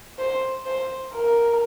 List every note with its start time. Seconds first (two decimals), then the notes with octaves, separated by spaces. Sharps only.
0.19 C5
0.66 C5
1.14 A#4